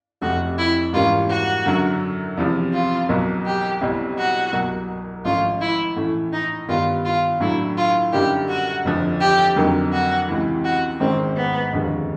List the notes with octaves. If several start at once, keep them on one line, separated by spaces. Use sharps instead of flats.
F1 F2 C3 F3 A3 F#4
E4
G#2 E3 G3 A#3 C#4 F4
F#4
F#2 D3 F#3
E2 C3 F3
F4
B1 B2 F#3 A#3
G4
B1 B2 G3 C4 E4
F#4
C2 B2 F#3 A#3
G#1 G#2 F3 A3 C#4 F4
E4
A2 E3 A3 C#4 E4
D#4
G2 D#3 G3 B3 D#4 F4
F4
A2 F#3 A3 D4 E4
F4
F#2 D3 G3 A#3 D#4 G4
F#4
F1 F2 D3 F3
G4
F2 D3 F#3 A#3 D#4
F#4
C#2 C3 E3
F#4
G#1 G#2 D#3 G#3 C4 C#4
B3
F1 D#2 D3 F3 G#3